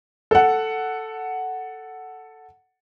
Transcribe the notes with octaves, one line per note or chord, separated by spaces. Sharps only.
A4 F#5